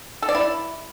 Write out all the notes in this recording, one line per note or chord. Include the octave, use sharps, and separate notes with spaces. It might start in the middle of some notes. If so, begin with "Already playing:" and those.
A4
D5
E4